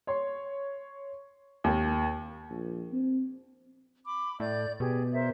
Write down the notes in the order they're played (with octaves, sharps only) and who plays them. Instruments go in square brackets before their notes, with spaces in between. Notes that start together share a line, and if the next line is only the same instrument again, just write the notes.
[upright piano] C#5 C6
D#2
[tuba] A#1
C4
[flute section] B5 D6
[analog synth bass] A2 [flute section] D5 G6
[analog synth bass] B2 [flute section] G4 G#4
[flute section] A#4 C5 E5